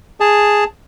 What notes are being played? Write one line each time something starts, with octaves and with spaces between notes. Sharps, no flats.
G#4 A5